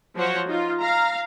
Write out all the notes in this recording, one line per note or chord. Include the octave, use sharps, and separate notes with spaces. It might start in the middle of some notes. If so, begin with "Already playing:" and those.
F3 F#3 F#4 C5 C#5 F#5
D#4 F4
F5 A#5